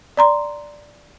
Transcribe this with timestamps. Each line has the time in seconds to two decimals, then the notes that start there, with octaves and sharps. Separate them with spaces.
0.17 D5 A#5 C6